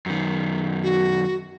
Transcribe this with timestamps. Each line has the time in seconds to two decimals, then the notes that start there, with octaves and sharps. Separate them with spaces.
0.06 F#2 D#3
0.83 F#4